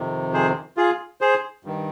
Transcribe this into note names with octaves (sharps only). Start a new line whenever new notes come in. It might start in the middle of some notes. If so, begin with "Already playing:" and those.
Already playing: F2 C3 D#3
G#4 C5
F4 G#4
G#4 C5
G2 D#3